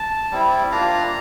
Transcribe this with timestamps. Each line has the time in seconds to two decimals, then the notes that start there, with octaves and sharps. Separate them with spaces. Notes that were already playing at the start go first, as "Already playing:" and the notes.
Already playing: A5
0.31 G3 C4 E4
0.72 A#3 D4 F4 A#5